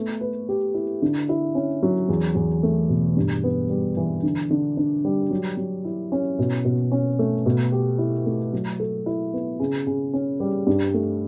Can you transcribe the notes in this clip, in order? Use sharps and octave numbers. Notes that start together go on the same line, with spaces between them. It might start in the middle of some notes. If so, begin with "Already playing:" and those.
Already playing: A3 B3
B4
G4
E4
D3
E4
C#4
F#3
E2
E2
A3
B2
G2
B3
G3
E3
D3
D3
D4
G3
F#3
F#3
E4
C#4
B2
B2
C#4
A3
B2
G4
E4
A3
F#3
A4
E4
B3
C#3
C#3
C#4
G3
G2
A3